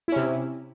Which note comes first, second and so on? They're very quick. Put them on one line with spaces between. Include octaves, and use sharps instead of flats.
E4 C#4 C3